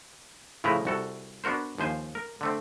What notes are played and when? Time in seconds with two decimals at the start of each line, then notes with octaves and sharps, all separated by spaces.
0.64 A2 C#3 F3 E4 B4 A#5
0.85 C2 F#4 A4
1.44 B3 D4 F#4 A#4 C5
1.78 D#2 F3 C5 G#5
2.15 A#4
2.41 D3 A3 C4